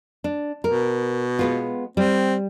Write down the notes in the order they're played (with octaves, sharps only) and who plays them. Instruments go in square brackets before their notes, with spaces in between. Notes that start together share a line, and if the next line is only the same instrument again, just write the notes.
[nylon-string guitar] D4
[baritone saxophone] B2 [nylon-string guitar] A#4
[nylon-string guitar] G#3 B3 F4
[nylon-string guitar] G3 [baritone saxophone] C4